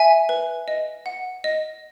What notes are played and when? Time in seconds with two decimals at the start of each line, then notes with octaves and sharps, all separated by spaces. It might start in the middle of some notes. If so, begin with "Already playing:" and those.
Already playing: E5 G#5
0.29 B4
0.68 D#5
1.06 F#5
1.44 D#5